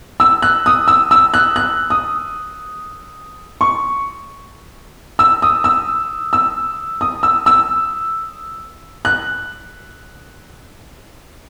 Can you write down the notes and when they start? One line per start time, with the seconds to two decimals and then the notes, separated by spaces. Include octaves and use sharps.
0.20 E6
0.42 F#6
0.66 D#6
0.88 E6
1.11 E6
1.34 F#6
1.56 F#6
1.90 D#6
3.61 C#6
5.19 E6
5.42 D#6
5.64 E6
6.33 E6
7.01 D#6
7.23 E6
7.46 E6
9.05 F#6